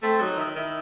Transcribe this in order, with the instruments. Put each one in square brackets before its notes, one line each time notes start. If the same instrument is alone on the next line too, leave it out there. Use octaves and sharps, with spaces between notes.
[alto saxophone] A3 [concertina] C4 C5
[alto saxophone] F#3 [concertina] D#4 D#5
[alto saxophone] D#3 [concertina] E5
[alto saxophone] D#3 [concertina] E4 E5